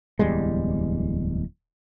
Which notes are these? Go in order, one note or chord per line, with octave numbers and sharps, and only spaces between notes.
D1 E2 G3 G#3